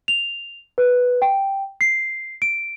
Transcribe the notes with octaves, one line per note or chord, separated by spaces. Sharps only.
F7
B4
G5
C7
D7